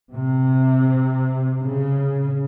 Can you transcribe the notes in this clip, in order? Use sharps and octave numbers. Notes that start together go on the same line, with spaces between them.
C3
C#3